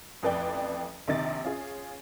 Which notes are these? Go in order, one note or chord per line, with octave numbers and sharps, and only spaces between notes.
A1 F2 B4 D5 G5
A#1 C3 D#3 D#5 A6
C#4 F4 G#4